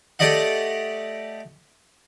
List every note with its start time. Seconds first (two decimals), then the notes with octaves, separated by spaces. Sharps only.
0.19 A3 G4 D5 D#5 F#5